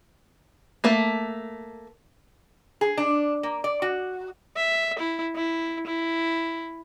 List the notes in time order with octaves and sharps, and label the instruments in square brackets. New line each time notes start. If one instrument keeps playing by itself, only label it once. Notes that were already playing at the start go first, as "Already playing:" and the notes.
[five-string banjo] A3 A#3
[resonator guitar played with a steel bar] G#4
D4
A#3
D5
F#4
[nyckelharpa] E5
E4
E4
E4